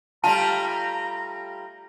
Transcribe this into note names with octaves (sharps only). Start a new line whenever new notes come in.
G3 A3 F4 A5 A#5